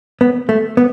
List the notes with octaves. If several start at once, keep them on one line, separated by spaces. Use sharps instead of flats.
B3
A3
B3